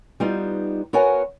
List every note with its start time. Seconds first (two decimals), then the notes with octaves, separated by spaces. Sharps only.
0.20 G3 B3 D#4 F4
0.93 B3 F#4 A#4 C#5 F#5 G#5